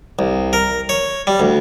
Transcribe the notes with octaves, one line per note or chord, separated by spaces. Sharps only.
C2
A#4
C#5
G3
D2